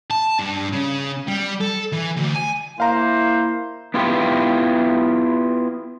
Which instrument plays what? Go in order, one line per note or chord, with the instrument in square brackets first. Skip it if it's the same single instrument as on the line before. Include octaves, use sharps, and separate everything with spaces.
[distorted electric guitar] A5
G2
C#3
G3
A4
E3
D2
G#5
[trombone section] A#3 E4 [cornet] C5 [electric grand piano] F5 A#5
[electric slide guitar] B3 E4 F4 G4 B4